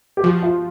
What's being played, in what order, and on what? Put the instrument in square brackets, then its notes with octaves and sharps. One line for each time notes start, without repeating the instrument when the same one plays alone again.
[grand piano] G4
[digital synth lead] F3 [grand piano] F#4
[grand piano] F4